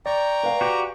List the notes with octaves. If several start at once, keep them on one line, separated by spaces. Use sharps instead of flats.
D5 G5 A#5 C#6
B4 F5 G#5
F#4 G4